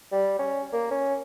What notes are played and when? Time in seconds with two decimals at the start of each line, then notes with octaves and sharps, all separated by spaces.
0.12 G3
0.39 C#4
0.73 A#3
0.91 C#4